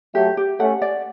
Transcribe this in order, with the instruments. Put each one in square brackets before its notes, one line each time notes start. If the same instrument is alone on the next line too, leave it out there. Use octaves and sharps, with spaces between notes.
[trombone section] F#3 A3 [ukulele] G4
[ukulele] G4
[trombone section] A3 C#4 [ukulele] F#5
[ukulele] D5